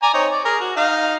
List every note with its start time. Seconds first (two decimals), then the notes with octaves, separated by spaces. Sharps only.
0.03 D5 G#5 A#5
0.14 C4 D#4 C#5
0.32 D5
0.45 G#4 A#4
0.60 F#4
0.76 D#4 F5